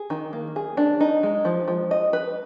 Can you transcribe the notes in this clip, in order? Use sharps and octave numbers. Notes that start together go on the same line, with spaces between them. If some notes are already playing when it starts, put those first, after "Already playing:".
Already playing: G#4
D#3
A#3
G#4
D4
D#4
G#3
F3
F3
D#5
B4